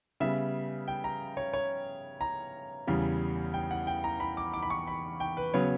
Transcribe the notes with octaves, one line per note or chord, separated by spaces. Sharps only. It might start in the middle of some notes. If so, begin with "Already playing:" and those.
C#3 G3 B3 E5
G5
A#5
C#5
C#5
A#5
E2 C#3 G3
G5
F#5
G5
A#5
B5
D6
D6
B5
C#6
B5
G5
B4
C#3 F#3 B3 C#5